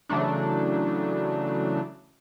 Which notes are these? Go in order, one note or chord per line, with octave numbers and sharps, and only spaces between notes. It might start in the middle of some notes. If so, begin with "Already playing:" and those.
C#3 E3 F#3 A3 D4